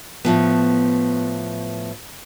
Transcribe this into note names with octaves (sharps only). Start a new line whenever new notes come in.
A2 F3 B3